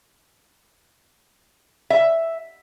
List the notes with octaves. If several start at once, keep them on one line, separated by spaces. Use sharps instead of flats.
E5